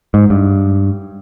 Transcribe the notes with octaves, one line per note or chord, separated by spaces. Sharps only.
G#2
G2